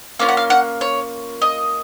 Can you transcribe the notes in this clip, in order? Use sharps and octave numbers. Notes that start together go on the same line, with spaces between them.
A#3 C#4 F4 F5
F#5
F5
F#5
C#5
D#5